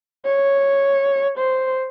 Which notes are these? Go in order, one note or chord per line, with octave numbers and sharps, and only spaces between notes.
C#5
C5